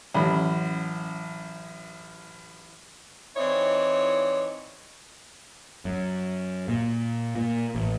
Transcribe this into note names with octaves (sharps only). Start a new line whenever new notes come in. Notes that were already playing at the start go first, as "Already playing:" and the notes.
A1 F#2 B5
E3 C4 D#4 E4 C#5 D5
F#2
A#2
A#2
A1